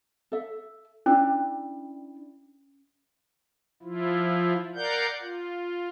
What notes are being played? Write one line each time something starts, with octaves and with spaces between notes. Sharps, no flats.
A4 E5
C#4 D4 E4 G5
F3 E4 F4
A#4 D5 F5 F#5 G6
F4